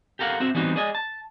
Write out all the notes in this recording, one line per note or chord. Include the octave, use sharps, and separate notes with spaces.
G4 A4 A#4 F5 F#5
C4 F#4 E5
E3 G3 B3 C4 D#4 F#4
G#4 D5 D#5 G#5
A5